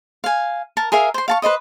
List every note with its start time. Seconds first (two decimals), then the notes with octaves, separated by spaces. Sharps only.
0.24 F5 G#5
0.77 A#4 A5
0.92 G#4 A#4 E5 F5
1.14 C5 C6
1.28 F5 A5 C#6
1.42 B4 C5 D#5 D#6